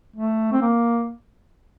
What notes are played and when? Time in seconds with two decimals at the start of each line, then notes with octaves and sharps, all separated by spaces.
0.16 A3
0.52 C4
0.61 A#3